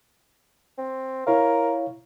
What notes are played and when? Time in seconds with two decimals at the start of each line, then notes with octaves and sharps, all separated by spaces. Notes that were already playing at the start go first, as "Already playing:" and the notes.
0.78 C4
1.27 E4 A#4 C#5 F5